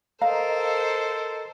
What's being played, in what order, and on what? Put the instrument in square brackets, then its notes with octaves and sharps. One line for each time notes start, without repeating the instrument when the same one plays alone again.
[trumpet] A4 [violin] A#4 C5 [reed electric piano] D#5 A#5 [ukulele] F5